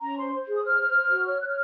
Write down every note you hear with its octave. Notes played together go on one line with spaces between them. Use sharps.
C#4 A#5
C5 C6
C5
G#4
D#6
C5 F6
C5
C5
F#4
C#5 F6
C#5 F#6
F6